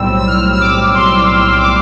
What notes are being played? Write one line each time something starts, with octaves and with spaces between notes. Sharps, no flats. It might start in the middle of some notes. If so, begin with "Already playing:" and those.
Already playing: B1 A2 G3 C4 E6
E6
F6
E6
D6
C6
D6